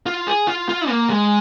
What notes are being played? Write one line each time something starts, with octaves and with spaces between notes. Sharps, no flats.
F4
G#4
F4
F4
A#3
G#3